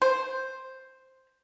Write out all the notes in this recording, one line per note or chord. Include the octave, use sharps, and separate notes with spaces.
C5